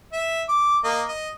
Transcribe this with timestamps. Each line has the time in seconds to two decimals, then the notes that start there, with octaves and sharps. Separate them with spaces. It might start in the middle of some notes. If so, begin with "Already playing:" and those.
0.13 E5
0.49 D6
0.84 A#3 D#5
1.09 D#5